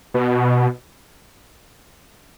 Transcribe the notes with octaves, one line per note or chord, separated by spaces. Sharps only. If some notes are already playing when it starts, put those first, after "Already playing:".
B2